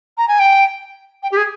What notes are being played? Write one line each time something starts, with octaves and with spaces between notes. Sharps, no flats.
A#5
G#5
G5
G5
G4
G#4